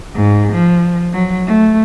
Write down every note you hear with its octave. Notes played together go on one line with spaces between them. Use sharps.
G#2
F3
F#3
A3